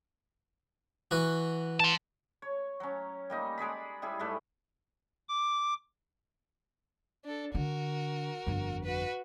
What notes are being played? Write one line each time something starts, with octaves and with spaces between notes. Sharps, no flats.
E3 F#4
A5 C6
C#5
F#3 C#4
G3 A#3 D#4
G#3 G#4 D5 B5
G3 E4 G#4
G#2 G3 A3 B4
D6
D4 A4
D3 F#4 A#4
G1 F2
F#4 B4